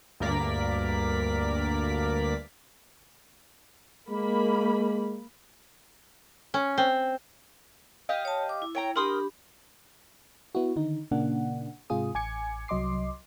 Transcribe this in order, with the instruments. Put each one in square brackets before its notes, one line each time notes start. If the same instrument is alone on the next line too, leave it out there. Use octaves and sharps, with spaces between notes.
[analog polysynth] D2 G2 A#3 A#4 D5 B6
[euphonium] G#3 [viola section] A#3 B5
[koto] C#4
C4
[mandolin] G4 D#5 F5
[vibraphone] C#5 A5
D6
E4
[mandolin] C#5 G5 A#5
[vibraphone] D4 G4 B5 [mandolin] A#4 C6 D#6
[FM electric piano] B3 E4 F#4
D3 D#3 D#4
A#2 C#3 A#3 D4 F#5
G#2 C3 F4 G#4 D#6
A1 G#5 D6 G#6 C#7
C2 F#3 D#5 C6 D6 C7